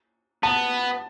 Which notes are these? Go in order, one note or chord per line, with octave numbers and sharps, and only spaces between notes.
B3 A5